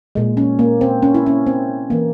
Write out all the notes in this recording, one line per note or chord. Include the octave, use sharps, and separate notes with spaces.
A#2 G#3
C#4
A#3
C4
C#4
E4
C#4
C4
E3 A#3